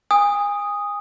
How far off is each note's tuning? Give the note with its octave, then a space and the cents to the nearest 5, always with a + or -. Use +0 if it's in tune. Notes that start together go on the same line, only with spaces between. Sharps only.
G#5 -30 D#6 +0